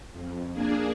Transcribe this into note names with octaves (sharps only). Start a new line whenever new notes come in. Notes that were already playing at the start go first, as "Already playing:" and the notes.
F2
A#3 D4 G#4